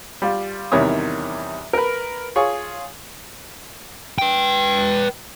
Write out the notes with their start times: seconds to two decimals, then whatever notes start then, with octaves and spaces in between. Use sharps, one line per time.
0.22 G3 F4
0.72 E2 C3 D#3 G3 C#5 D#6
1.73 A#4 B4
2.36 F4 G#4 C#5 C#6
4.19 B4 G5